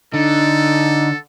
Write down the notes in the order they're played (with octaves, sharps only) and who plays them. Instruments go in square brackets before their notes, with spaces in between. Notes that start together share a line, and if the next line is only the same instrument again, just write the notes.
[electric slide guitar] D3 [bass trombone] D#4 [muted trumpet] A4